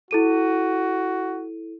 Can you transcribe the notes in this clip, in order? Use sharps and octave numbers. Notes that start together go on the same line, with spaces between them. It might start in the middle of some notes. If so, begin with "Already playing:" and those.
E4 F#4 A4 D#7